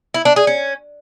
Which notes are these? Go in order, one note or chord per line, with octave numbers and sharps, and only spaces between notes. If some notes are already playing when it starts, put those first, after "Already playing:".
E4
D4
G#4
C#4